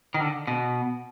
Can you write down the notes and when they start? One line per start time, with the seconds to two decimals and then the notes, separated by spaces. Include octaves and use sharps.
0.14 D#3
0.20 D3
0.47 B2